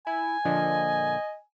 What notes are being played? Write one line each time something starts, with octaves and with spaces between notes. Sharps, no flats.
E4 G#5
A#2 D3 F3 D#5